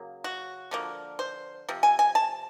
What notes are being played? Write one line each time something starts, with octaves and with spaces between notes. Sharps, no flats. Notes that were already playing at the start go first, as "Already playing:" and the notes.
Already playing: C#3 F#3 A#3
F#4
D3 F3 A#3
C5
C3 F3
G#5
G#5
A5